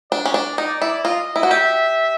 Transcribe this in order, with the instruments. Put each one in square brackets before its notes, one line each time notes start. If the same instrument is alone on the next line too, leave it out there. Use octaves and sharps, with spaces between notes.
[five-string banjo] D4 [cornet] D5
[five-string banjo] C#4
D4
D#4
E4
[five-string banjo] F4 [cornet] D#5
[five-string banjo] E4
F#4
[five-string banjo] G4 [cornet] E5